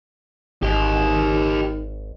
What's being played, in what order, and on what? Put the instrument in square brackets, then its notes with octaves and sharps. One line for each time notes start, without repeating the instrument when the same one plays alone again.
[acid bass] G#1 [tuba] D#3 [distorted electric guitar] G4 D#5